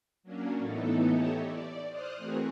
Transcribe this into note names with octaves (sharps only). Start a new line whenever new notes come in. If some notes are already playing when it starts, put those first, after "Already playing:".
F#3 A#3 C#4 D4
A2 E3 B3 D#4 A4
G4 A4 C#5 D#5 E5
D5
C5 D#6 F6 F#6
E3 A3 C4 F#4 G#4 A#4